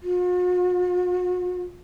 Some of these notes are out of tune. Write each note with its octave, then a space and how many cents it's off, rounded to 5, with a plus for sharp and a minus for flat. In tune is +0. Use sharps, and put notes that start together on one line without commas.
F#4 -45